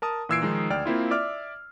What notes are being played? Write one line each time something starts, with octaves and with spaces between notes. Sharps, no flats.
A#4 A5 D#6
A#2 E3 E6 G#6 C7 D7
D#3 F3 G#3 D#4
D2 D5 G5 F6
A#3 C4 E4 F4
D5 E5 D6 F6